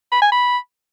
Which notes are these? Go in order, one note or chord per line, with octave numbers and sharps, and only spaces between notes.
B5
G#5
B5